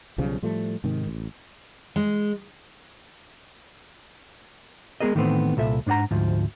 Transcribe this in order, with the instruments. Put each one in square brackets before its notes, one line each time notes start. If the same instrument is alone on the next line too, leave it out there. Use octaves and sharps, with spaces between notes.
[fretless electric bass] B1 C#3 F3 G3
A2 F3 G3 A3
G#2 C3 D#3
A1
[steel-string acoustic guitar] G#3
[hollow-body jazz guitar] G#3 B3 D4 G#4 A#4 D#5
A2 D#3 E3 A3 B3 C4
C2 A#2 A4 E5
G#2 D4 D5 F#5 A#5
D2 G#2 F3